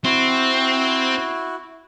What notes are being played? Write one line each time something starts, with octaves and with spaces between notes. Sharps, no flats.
C4 E4 F#4